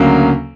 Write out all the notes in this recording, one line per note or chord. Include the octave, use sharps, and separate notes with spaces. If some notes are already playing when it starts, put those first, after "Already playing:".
Already playing: D2 C#3 F#3 A#3